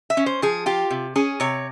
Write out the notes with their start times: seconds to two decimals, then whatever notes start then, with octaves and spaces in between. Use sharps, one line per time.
0.10 E5
0.17 C#4
0.26 C5
0.42 F3 G#4
0.66 F4 G4
0.90 C3
1.16 C#4 G#4
1.40 C3 C#5